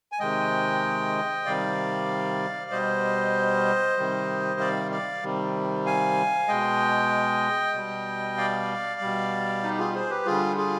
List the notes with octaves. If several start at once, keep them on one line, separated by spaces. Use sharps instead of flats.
G#5
C3 D#3 G#3 D#5 G5
C3 D#3 G3 D5 F5
B2 G3 C5 D#5
C3 D#3 G3
D5 F5
D5 F5
C3 D#3 G3
F5 G#5
B2 G#3 D#5 G5
B2 G3
D5 F5
B2 G3
D#4 G4
F4 G#4
G#4 C5
G4 B4
D3 G3 F4 G#4
F4 G#4